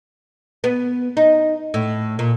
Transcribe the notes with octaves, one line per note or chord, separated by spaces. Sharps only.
B3
D#4
A2
A#2